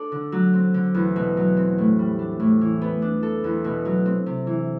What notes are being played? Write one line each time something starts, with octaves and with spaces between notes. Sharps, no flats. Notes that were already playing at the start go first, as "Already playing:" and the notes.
Already playing: D4 A4 D5
D3
F#3
C4
D3
E2
B2
F#3
C4
A2
G3
D4
A2
E3
B3
D4
A4
E2
B2
F#3
C4
C3
E3